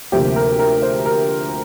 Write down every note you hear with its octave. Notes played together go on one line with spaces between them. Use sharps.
D2 C3 F3 A#3 G4
A#4
A#4
C5
A#4